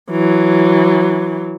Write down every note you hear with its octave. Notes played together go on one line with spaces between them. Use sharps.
E3 F#3